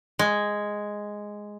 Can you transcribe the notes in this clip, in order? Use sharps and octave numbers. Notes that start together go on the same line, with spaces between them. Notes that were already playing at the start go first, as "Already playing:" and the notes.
G#3